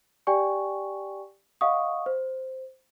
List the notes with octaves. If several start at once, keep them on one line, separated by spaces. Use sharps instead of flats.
G4 D5 G5 G#5 C#6
D#5 F5 F#5 C#6 D#6
C5